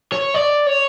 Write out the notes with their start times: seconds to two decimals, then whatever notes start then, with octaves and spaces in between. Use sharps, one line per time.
0.12 C#5
0.35 D5
0.67 C#5